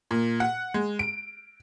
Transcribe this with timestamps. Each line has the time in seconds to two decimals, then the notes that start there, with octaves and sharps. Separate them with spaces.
0.11 A#2
0.40 F#5
0.74 G#3
0.99 D7